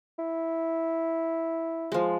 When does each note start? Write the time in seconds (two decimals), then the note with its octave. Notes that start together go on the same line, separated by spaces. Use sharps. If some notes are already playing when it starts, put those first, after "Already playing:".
0.19 E4
1.92 F3 G#3